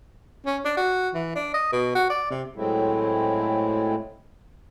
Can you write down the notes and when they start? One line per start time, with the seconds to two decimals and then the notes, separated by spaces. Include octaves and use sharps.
0.46 C#4
0.65 D4
0.77 F#4
1.14 E3
1.36 D4
1.54 D#5
1.72 B2
1.95 F#4
2.10 D5
2.30 C3
2.56 A2 F#3 G#3 A3 C4 E4